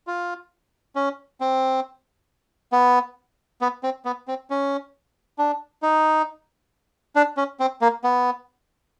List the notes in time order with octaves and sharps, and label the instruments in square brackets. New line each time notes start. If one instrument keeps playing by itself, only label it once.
[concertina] F4
C#4
C4
B3
B3
C4
B3
C4
C#4
D4
D#4
D4
C#4
C4
A#3
B3